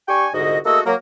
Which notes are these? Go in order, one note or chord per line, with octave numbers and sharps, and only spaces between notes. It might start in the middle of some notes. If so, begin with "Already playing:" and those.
D4 G4 G5 G#5 C#6
C2 G#2 D3 F#4 D#5
A3 A#3 F#4 G#4 D#5 E6
F#3 A#3 A#4